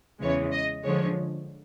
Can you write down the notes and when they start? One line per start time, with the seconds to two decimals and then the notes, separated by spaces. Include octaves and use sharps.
0.21 E2 C#3 E3 G#3 C#5
0.52 D#5
0.83 D3 F3 G#3 C#5